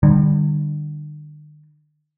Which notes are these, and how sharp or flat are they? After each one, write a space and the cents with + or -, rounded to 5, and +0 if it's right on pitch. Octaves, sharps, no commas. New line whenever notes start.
D3 +45 G3 +10